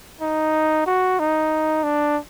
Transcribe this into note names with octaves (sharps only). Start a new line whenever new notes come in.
D#4
F#4
D#4
D4